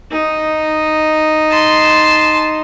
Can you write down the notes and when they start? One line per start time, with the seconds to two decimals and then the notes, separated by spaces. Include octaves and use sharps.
0.11 D#4
1.50 A5 C6